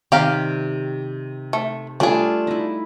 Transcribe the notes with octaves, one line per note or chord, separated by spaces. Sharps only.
C3 D#3 G4 D5 F5 A#5
A3
G3 A3 D4 F4 G#4
D#4 E4